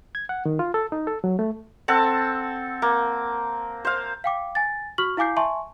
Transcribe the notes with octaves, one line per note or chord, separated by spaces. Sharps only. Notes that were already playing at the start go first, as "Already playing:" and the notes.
G#6
F#5
D#3
F4
A4
D#4
A4
F#3
A3
C4 A4 F#5 A5
A#3
C5 F5
F5 G5 D6
G#5 A6
F#4 C#6 F6 F#7
E4 F5 G#5 D6 G6 C7
E5 G#5 A5 C6 C#6